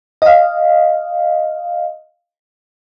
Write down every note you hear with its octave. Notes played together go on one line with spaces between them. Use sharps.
D#5 F5